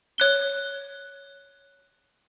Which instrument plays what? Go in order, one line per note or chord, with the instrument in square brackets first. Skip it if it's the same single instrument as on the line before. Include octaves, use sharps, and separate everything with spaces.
[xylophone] C#5 F#6 G7